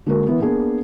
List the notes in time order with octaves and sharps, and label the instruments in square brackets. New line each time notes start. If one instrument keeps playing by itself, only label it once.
[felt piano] D3 G#3 A#3 D4 F#4 A#4
E3 B3
A#3 B3 D4 G#4 A#4